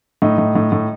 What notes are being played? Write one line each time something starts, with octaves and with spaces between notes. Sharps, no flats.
A2 D#4
A2
A2
A2